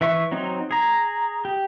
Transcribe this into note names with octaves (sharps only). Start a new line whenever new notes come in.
E3 E5 C#6
F#3 C4 D#4
G#4 A#5
G4